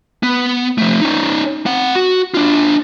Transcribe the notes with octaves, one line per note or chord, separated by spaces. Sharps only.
B3
F3 A3
C#4 D#4
C4 F#5
F#4
D4 F4